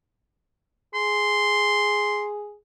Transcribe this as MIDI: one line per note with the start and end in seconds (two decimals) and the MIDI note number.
0.94 2.55 68
0.94 2.26 84